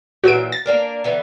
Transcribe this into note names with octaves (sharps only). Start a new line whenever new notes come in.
A#2 E3 F#3 F#4 D7
A6
A#3 D4 A#4
D3 E3 B3